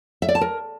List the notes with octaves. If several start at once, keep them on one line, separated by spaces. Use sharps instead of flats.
E5
D5
A5
A#4